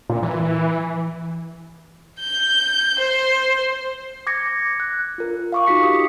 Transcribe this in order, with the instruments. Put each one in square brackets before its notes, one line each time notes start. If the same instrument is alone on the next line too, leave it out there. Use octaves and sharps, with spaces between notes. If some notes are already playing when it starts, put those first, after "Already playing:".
[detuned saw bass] A#2
E3
[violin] G6
C5
[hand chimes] D6 G#6 A#6 C#7
F#6
F4 A#4
F5 C#6 D6
D#4 F4 F#4 B6 C#7
G4 D#6